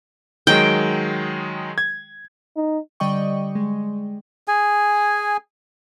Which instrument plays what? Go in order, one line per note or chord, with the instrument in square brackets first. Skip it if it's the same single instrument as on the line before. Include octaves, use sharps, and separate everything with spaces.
[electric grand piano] D#3 F#3 G#3 [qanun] G5
[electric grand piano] G#6
[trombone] D#4
[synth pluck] D3 G3 D5 D#5 G5 C#6
G#3
[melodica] G#4 G#5